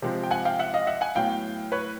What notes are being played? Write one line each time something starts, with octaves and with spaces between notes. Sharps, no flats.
C3 F3 G#3 C4
G5
F#5 G#5
F5 G5
E5 F#5
D#5 F5
E5 F#5
F#5 G#5
A2 F#3 B3 F5 G5
B4 C#5